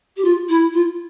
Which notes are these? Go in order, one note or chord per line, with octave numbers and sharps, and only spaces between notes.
G4
F4
E4
F4